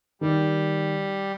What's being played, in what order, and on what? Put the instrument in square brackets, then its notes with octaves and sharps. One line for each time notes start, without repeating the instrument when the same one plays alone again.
[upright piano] D#3 [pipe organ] G3